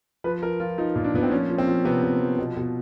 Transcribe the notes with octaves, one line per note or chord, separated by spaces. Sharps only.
F3 B4
F3 A#4
F3 F4
F3 D#4
A#2
D4
A#2 B3
C4
F3 C#4
F3
C4
F3
C3 B3
C3
F3
B2
B2